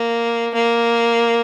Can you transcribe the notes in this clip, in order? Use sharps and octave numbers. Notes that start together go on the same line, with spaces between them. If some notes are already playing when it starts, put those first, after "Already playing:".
Already playing: A#3
A#3